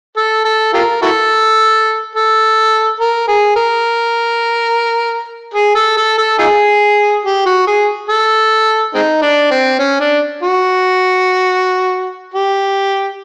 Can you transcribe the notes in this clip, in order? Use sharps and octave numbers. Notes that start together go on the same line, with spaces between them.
A4
A4
F4 G4 A#4
E4 F#4 A4
A4
A#4
G#4
A#4
G#4
A4
A4
A4
D#4 F4 G#4
G4
F#4
G#4
A4
G#3 C4 D#4
D4
C4
C#4
D4
F#4
G4